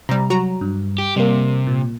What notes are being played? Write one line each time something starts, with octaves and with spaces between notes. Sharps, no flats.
C3 G3 A#5
F#3 F#4 A#5
G2
G4
C3 G3 A#3
A#2